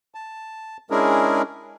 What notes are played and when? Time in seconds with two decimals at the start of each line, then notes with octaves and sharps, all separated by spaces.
0.15 A5
0.90 G#3 C#4 D4 E4 G#4 A#4